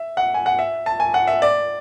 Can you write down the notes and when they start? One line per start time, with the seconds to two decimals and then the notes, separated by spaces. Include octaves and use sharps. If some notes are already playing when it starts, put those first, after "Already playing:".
Already playing: E5
0.17 F#5
0.34 G#5
0.46 F#5
0.59 E5
0.86 A5
1.00 G#5
1.14 F#5
1.27 E5
1.42 D5